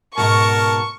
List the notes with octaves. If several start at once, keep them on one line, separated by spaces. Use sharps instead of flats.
G#2 B2 A#4 A5 C#6